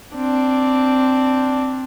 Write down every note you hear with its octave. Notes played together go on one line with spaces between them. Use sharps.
C4 D4